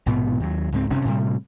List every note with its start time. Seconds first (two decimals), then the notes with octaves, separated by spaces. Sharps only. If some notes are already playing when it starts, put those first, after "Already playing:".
0.06 A#1 G#2 B2 B3
0.40 D#2 F#3
0.72 C#2 G#2 F3 C4
0.90 F#1 C3 C#4
1.05 A2 C3 G3